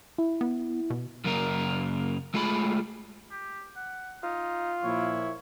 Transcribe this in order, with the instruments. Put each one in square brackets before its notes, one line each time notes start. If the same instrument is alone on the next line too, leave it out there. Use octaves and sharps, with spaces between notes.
[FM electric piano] E4
[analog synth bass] B3
B2
[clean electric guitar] F#2 C#3 A#3 A#4
G#3 A3 F4 G#4 B5
[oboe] G4
F#5
[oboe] D#4 [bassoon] F4
[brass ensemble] A#2 F3 E4 [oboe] C#5